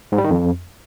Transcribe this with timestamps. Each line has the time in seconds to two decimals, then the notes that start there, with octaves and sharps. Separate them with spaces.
0.12 G#2
0.18 G3
0.24 D#3
0.30 F2